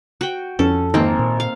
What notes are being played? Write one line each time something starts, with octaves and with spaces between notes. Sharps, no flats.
F#4 G5
F2 C#4 A4
G#1 A#3 C4
A#2
F5